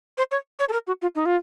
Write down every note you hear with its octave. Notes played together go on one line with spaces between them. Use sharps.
C5
C#5
C#5
A4
A#4
F#4
F4
D#4
F4